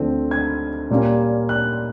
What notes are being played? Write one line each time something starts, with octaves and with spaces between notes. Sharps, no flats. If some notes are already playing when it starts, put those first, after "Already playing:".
Already playing: D2 D3 F3 A3 C4
G#6
A#2 G3 A#3 C#4
F#6